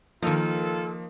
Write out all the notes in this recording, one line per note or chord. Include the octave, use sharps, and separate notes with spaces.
D#3 F3 A#3 D#4 F4 A4